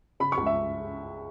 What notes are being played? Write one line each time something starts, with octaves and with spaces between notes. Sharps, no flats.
C#3 B5
C#6
C#2
E5